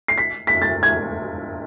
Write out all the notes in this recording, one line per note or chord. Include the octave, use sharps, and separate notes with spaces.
C7
B6
B6
A6
G#6